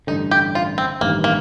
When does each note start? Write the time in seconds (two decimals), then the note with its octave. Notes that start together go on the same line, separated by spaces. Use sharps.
0.07 A1 G2 D3 D#4
0.31 G4
0.55 F4
0.78 C4
1.01 A1 G2 D#3 A#3
1.24 A#3